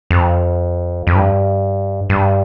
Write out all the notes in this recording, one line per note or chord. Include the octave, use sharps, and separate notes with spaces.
F2
F2
G2
G2